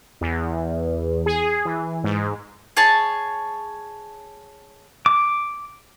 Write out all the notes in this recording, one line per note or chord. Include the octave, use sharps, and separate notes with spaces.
E2
G#4
E3
G#2
G#4 C#5 A5
D6